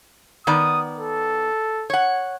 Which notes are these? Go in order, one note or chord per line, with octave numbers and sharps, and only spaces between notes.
D#3 B3 D5 D#6
A4
C#5 F#5